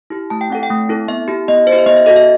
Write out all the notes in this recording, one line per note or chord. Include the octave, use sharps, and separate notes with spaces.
E4 G4
A3 A5
G5
C4 E4 A4 F#5
G5
A3
C4 E4 A4
B3 E5
E4 G4
B3 D#5
E4 C5
G4
E5
B3 D#5
E5
F#4 A4 D#5
E5